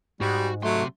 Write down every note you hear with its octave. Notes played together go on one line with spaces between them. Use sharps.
G#2 G3 F#4
C3 F#3 A3 C6